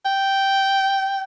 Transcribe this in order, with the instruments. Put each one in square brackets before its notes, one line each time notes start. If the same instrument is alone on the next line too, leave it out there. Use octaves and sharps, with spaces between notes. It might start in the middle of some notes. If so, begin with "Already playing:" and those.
[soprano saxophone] G5